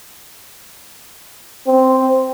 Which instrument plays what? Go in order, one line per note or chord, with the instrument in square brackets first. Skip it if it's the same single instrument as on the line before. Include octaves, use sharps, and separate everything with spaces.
[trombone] C4